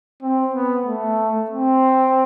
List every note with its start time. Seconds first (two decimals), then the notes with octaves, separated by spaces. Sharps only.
0.22 C4
0.54 B3
0.86 A3
1.50 C4